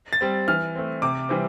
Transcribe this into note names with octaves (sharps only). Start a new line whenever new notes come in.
A6
G3 C4
E3 F6
A3 C4
C3 D6
E3 G3 C4